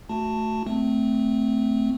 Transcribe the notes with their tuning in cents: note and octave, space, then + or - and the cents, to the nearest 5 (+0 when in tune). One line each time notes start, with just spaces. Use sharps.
A3 +0 F#4 +0 A5 +10
A3 +0 C4 -15